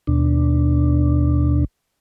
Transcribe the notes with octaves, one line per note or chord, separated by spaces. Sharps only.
D#2 B2 D4